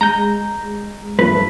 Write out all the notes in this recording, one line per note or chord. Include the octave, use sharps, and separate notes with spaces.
G#3 A#5 G6
G2 F3 A3 B4